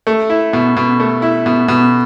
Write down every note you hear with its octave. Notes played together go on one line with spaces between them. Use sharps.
A3
E4
B2
B2
A3
E4
B2
B2